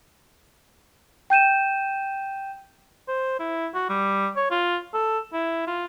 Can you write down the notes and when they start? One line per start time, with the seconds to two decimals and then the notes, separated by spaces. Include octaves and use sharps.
1.30 G5 G6 D#7 E7
3.08 C5
3.39 E4
3.74 F#4
3.89 G3
4.36 C#5
4.51 F4
4.94 A4
5.33 E4
5.67 F4